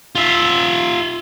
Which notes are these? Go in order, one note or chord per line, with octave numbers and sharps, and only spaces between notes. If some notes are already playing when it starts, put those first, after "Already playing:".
F4 E5